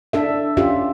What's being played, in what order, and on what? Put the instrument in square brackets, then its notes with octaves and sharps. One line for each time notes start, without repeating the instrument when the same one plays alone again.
[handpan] D4 A4 E5
C#4 F4 G4 E5